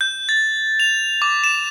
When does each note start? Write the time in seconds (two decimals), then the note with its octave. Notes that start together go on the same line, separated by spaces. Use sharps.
0.01 G6
0.29 A6
0.80 F7
1.22 D6
1.44 E7